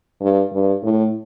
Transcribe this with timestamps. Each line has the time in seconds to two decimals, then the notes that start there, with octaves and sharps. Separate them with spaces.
0.21 G2
0.53 G2
0.83 A2